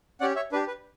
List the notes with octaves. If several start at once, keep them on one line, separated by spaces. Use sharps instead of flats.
C#4 G4 D5 F#5
C#5 E5
D4 G4 B4
B4